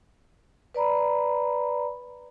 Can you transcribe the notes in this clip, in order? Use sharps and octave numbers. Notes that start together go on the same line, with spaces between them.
B4 D5 A#5 B5